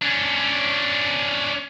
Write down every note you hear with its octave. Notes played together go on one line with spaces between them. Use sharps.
C#4 D4